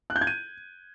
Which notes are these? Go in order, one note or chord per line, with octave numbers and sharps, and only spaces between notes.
F#6
G6
G#6
D#7